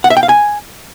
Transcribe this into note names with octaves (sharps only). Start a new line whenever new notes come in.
F#5
E5
G5
F5
G#5